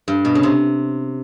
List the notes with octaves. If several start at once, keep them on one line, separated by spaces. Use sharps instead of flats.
G2
B2
C#3
C3